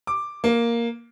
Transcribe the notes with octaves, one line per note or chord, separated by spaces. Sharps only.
D6
A#3